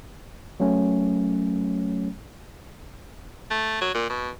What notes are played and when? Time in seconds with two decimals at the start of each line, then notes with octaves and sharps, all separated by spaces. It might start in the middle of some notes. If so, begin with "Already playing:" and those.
0.60 F#3 A3 C#4
3.51 A3
3.81 F#3
3.94 A#2
4.10 B2